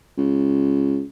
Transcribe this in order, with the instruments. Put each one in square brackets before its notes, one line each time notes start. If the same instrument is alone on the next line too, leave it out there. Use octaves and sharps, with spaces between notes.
[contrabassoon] C#2